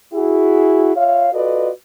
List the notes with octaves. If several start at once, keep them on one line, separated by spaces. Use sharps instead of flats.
E4 F#4 G#4
F4 C#5 E5 F5
F4 F#4 A4 B4 D5 D#5